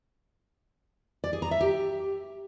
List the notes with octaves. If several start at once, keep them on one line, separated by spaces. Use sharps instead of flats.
D5
G#4
A#5
E5
G4